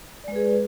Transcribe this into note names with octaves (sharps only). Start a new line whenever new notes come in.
G#3 G#4 B4 D5